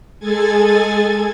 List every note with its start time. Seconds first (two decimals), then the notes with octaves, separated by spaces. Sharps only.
0.20 G#3 G#4 A4 G#5 G#6 A6